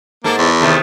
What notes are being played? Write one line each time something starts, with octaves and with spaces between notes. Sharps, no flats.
G#2 A#3 A4
E2
C3 D#3 A3